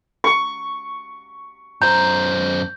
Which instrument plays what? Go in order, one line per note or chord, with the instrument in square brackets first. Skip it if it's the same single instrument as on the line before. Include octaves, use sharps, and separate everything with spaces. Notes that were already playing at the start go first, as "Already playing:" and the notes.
[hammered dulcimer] C#6
[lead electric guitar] F#2 C5 [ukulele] A#5 [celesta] G6